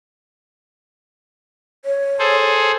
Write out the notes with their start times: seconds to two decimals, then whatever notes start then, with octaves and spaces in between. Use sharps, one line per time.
1.85 C#5
2.19 G#4 A4 C5